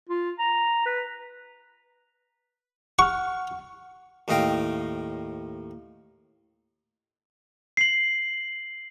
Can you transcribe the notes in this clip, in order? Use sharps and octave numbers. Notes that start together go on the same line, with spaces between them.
F4
A#5
B4
F#5 C#6 F6
D#2 A2 D#5 F5 G5
C7 F#7